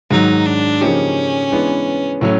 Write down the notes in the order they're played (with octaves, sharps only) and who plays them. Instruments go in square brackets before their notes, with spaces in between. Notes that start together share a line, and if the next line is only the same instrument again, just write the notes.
[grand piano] G#2 D#3 F#3 [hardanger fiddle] D#4
[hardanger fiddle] D4
[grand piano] C#3 F3 A#3 D#4 G4 [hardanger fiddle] C#4
[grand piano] E3 G#3 B3 D4
A2 F#3 A3 C#4